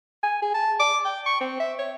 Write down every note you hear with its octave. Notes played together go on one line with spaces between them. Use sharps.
G#5
G#4
A5
D6
G5
C#6
C4
E5
C#5